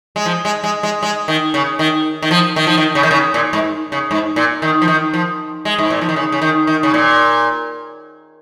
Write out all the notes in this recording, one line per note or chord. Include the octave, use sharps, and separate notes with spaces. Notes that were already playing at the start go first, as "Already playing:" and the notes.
G#3
F3
G#3
G#3
G#3
G#3
D#3
C#3
D#3
D#3
F3
D#3
F3
D#3
C#3
D#3
C#3
A#2
G#2
C#3
G#2
A#2
D#3
F3
D#3
F3
G#3
G#2
A#2
F3
D#3
C#3
C#3
D#3
D#3
C#3
A#2